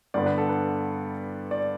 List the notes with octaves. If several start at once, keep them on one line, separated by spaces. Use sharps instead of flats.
G2 D3 B3 D5
B4
A4
B4
D5